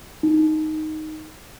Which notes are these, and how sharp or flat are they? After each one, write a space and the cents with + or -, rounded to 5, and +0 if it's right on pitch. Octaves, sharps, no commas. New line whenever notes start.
D#4 +0